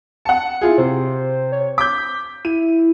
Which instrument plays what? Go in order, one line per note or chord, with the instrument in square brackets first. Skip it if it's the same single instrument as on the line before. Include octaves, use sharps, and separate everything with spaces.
[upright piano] F#5 A5 [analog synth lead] C#7
[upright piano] E4 F4 G#4
[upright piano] C3 [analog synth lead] C5
[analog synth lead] C#5
[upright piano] D6 G6 [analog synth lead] B6
[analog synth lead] E4 [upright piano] D#7